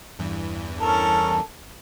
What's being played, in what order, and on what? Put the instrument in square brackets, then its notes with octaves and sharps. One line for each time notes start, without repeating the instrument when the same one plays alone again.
[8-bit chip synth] E2 G2 E3
[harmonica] C#4 A4 A#4 [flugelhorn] A5